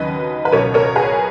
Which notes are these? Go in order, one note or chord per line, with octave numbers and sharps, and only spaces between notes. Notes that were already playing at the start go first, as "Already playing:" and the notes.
Already playing: D#2 C#3 F#3 B4 D#5
B4
C#2 B2 F#3 A#4 C#5
A#4 C#5
G#4 B4